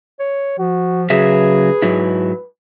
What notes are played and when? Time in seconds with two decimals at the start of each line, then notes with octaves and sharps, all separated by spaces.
0.19 C#5
0.59 F3 F#4
1.10 C#3 F#3 G#4 B4 E5
1.82 G#2 F#3 E4